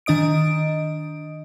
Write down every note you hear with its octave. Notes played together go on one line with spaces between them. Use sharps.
D#3 D4 D#5 D#6 D7